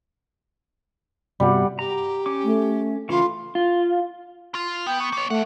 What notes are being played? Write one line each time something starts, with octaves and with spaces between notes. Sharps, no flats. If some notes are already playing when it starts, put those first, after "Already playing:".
G2 C3 G3 B3 F#5
G4 A#5
C#4 D6
A3
C#3 E3 A3 F4
F4
F4
B3 G5
C#6
A#3 C#5
F2 A3 F#5